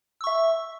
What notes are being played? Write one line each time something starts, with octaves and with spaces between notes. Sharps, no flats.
E5 C#6 E6